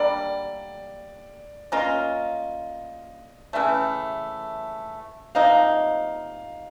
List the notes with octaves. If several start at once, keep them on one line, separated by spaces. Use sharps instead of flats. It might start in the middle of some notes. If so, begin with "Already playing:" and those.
Already playing: D3 G3 A#3 D5
A#3 C#4 F4 D#5
C#3 E3 A3 E5
C3 F3 A#3 D#4 F5